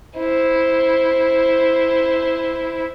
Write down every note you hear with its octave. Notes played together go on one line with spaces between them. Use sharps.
E4 C5